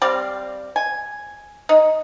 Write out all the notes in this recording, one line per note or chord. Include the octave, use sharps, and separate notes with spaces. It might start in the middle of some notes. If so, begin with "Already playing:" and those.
G3 C4 D5 F5
G#5
D#4